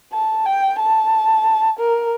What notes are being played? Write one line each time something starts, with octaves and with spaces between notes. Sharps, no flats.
A5
G5
A5
A#4